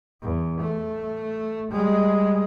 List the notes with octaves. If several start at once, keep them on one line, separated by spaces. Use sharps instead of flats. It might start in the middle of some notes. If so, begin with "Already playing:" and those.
E2
A3
G3 G#3